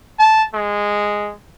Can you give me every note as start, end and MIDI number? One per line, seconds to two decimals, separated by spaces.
0.19 0.44 81
0.54 1.33 56